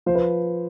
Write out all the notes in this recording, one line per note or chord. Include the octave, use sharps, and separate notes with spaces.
F3 C5
B4